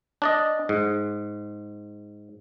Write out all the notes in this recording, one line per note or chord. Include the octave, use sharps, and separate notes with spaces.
D4 D5 D#5
G#2